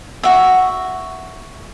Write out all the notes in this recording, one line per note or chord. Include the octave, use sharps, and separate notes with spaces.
F#4 E5